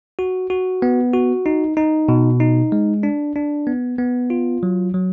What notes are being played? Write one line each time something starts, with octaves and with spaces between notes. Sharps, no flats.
F#4
F#4
B3
F#4
D#4
D#4
B2
D#4
G#3
D4
D4
B3
B3
F4
F#3
F#3